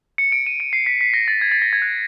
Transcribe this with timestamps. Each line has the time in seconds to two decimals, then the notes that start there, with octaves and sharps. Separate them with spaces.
0.18 C#7
0.32 D7
0.47 D#7
0.60 D7
0.73 C7
0.86 B6
1.01 B6
1.14 A#6
1.28 A6
1.41 G#6
1.52 A6
1.62 A#6
1.73 G#6
1.82 F#6